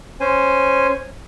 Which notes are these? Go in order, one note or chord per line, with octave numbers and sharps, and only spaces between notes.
C#4 C5 G#5